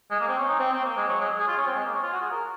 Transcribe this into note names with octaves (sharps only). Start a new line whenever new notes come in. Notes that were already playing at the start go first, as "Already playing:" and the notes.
G#3
A#3
C4
C#4
D#4
C4
C4
A#3
G#3
F#3
G#3
G#4
F4
C#4
C4
G#3
A#3
C#4
F4
F#4
G#4
A#4